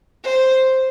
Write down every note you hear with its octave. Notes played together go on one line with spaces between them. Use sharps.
C5